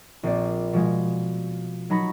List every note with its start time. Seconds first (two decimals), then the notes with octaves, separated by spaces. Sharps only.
0.23 A#1 C4 D5
0.73 B2 F3 G#3
1.90 F#3 D#4 A#5 B5 C#6 A#6